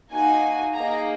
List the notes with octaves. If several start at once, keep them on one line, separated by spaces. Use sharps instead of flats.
A#3 D#4 F#4 G#5
A#3 D#4 G#4 A#5